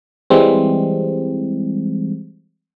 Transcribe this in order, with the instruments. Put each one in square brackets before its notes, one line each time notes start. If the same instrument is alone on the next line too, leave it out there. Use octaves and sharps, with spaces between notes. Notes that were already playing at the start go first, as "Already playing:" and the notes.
[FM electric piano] E3 G3 G#3 C4